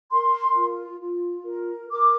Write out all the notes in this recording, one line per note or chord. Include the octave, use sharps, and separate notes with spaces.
A#4 C6
F4
F4
A#4
A#4 D6